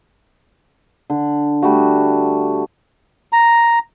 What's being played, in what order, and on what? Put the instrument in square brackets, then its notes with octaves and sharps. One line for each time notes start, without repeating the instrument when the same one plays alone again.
[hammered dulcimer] D3
G3 A3 F#4
[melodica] A#5